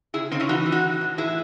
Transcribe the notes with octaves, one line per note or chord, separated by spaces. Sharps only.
C#3 E4 G#4
C#3 C4 D#4
C#4 E4
E3 D#4 F#4
E3
D#4 F#4
A2
A2
E3 E4 G#4